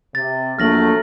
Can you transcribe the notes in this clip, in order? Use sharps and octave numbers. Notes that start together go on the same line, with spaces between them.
C3 A6
A#1 F#3 A3 F6 A#6 F#7